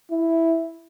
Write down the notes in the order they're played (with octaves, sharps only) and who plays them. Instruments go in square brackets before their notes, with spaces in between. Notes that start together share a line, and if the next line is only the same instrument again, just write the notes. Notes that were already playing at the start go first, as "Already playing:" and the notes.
[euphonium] E4